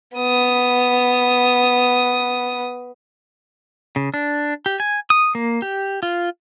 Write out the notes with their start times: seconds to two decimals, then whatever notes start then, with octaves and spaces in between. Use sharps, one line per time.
0.16 B3 D#6
3.96 C#3
4.14 D4
4.66 G4
4.80 G#5
5.10 D#6
5.35 A#3
5.62 G4
6.03 F4